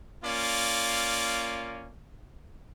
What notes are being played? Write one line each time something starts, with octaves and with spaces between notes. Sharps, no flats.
A#3 C#4 F4 D5